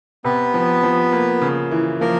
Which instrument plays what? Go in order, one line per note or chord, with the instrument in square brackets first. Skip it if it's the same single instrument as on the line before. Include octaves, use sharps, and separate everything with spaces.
[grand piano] C3 [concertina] B3 B4
[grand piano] F3
F3
A#3
C#3
E3
[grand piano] F3 [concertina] A#3 A#4